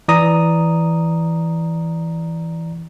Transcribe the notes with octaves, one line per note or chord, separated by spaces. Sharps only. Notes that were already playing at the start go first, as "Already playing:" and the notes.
E3 D5 A#5 D#6